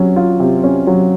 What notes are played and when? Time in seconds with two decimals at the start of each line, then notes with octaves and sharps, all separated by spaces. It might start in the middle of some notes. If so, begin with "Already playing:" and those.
Already playing: C3 F#3 C#4
0.16 F4
0.40 C3
0.64 C#4
0.87 F#3